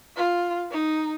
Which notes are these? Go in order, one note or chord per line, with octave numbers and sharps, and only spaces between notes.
F4
D#4